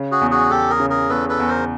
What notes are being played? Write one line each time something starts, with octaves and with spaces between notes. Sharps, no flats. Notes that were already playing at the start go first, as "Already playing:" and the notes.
Already playing: C#3
F#4 G#4
E2
F#4 G#4
E2 G4 A4
G#4 A#4
C#3
G#4 A#4
E2 A4 B4
A4 B4
E2
A#4 C5